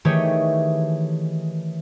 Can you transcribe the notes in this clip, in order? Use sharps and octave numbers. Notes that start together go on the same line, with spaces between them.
D#3 E3 A3 G4 G#4 C#5